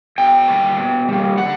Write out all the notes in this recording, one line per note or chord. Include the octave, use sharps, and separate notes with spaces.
B2 G5
G3 A#3
B2
G3 A#3
D3 F#5